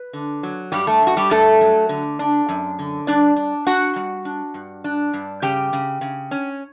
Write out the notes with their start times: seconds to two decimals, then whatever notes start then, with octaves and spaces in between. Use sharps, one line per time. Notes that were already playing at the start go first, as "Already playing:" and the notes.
Already playing: B4
0.13 D3
0.43 F#3
0.72 G2 G3 G4
0.87 A3 A4
1.02 G2 F#4
1.17 G3 G4
1.31 G2 A3 A4
1.61 F#3
1.89 D3
2.19 D4
2.49 F#2
2.79 D3
3.07 G3 D4 D5
3.36 D4
3.67 D4 F#4 F#5
3.96 G3
4.25 D4
4.54 G2
4.84 D4
5.13 G2
5.42 C#3 G4 G5
5.73 C#3
6.01 C#3
6.31 C#4